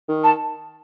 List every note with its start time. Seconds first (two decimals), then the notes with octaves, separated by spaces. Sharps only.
0.09 D#3
0.24 A5